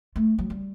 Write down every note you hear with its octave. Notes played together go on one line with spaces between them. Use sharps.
A3
F#3
G3